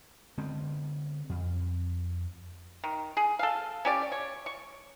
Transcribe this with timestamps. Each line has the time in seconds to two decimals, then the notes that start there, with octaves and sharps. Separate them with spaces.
0.38 D3 G#3 B3 C4
1.29 F2
2.84 D#3
3.17 G#4
3.39 A4 F5
3.85 C#4 G4 D5
4.12 C#5
4.46 C#6